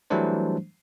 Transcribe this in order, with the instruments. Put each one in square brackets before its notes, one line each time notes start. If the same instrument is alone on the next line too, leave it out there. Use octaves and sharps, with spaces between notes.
[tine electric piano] E3 F#3 G3 A3 D4 C5